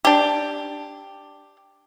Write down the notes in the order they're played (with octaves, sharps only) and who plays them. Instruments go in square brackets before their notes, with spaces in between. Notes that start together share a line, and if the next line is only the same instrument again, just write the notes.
[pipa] D4 G4